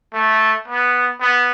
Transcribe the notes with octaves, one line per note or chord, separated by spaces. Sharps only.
A3
B3
B3